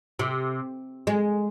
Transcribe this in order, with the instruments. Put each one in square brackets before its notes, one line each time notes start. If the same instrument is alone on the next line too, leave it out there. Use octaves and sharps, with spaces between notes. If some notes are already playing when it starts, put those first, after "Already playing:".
[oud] C3
G#3